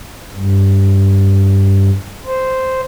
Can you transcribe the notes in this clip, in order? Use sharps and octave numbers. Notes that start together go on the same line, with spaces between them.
G2
C5